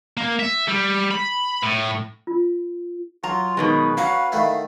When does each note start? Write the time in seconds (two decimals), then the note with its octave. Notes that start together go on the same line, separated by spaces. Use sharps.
0.17 A#3
0.39 E5
0.68 G3
1.11 B5
1.63 A2
2.27 F4
3.24 F#3 F4 A#5
3.57 B2 D#3 G#3 B4
3.97 C#4 F#4 F5 A#5
4.32 D#3 A3 E4